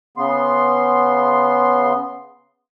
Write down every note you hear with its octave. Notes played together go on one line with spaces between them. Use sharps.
C#3 B3 C6